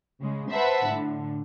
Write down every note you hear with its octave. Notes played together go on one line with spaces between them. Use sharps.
C#3 G#3
B4 C5 E5 F#5 A5 B5
A2 D3